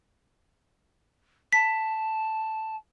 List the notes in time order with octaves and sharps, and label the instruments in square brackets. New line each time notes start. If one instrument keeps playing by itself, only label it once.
[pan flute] A5 [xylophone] B6